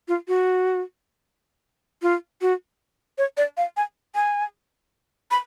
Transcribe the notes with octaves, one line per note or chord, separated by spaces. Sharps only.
F4
F#4
F4
F#4
C#5
D5
F5
G#5
G#5
B5